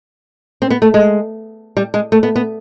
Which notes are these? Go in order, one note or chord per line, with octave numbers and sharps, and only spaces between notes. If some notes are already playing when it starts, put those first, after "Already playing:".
C4
B3
A3
G#3
G3
G#3
A3
B3
B3